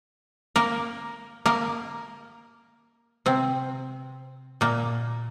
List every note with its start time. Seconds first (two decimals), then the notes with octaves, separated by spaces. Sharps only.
0.56 A#3 A#4
1.46 A#3 A#4
3.26 C3 C4
4.61 A#2 A#3